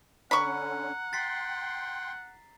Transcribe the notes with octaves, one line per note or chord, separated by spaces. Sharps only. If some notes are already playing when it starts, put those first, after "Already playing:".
D3 C#4 F#5 A#5 B5 C#6
G5 C6 A6 B6 C7